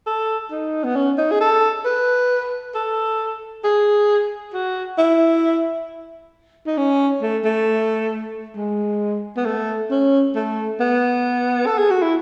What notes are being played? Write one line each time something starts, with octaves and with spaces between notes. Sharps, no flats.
A4
D#4
B3
C#4
D#4
G#4
A4
B4
A4
G#4
F#4
E4
D#4
C#4
A3
A3
G#3
B3
A3
C#4
A3
B3
A4
G#4
F#4
E4